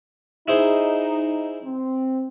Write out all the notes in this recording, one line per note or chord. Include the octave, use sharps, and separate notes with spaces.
D#4 E4 G#4 C5
C4